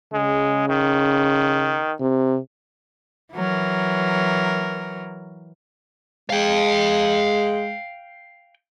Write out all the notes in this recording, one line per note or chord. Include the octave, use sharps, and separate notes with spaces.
C#3 G#3
D#3
C3
E3 F#3 A#4
G#3 F5 G5